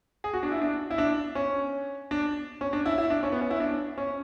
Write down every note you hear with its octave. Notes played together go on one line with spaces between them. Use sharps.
G#4
F#4
D4
E4
D4
E4
D4
C#4
D4
C#4
D4
E4
E4
D4
C#4
B3
C#4
E4
D4
C#4